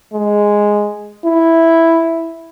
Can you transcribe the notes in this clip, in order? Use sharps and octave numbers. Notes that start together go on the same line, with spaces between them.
G#3
E4